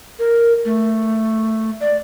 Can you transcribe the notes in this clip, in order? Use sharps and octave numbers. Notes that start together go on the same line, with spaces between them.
A#4
A3
D5